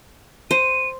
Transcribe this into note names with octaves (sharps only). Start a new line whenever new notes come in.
C5 D#7